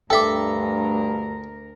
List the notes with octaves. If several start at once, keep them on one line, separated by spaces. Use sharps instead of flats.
D2 G2 A4 A#4 E5 G5 D6